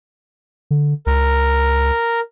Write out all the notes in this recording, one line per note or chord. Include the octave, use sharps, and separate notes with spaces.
D3
C#2 A#4